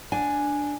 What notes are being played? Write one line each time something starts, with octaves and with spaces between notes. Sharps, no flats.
D4 G#5